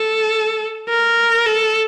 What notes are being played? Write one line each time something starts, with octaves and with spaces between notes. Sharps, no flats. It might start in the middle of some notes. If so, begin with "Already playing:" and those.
Already playing: A4
A#4
A4